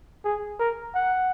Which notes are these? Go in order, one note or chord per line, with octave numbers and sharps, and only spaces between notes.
G#4
A#4
F#5